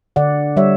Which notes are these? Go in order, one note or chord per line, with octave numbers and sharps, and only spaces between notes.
D3 D5 F#5
G3 C#5 E5